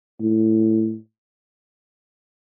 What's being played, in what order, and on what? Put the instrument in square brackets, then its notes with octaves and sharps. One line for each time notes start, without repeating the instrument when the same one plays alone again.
[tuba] A2